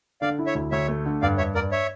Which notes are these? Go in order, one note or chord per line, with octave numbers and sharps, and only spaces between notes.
D3 D5 F5
E4
C#5 E5
D2
D2 C#5 E5
A3
D3
G2 D5 F5
G2 C#5 E5
G2 A#4 D5
C#5 E5